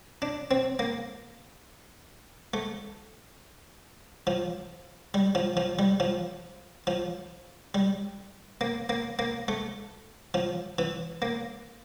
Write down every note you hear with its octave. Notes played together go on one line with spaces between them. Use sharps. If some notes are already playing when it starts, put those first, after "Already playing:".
D4
C4
A#3
A3
F3
G3
F3
F3
G3
F3
F3
G3
A#3
A#3
A#3
A3
F3
E3
A#3